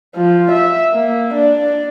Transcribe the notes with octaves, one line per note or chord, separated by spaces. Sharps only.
F3
E5
A#3
D4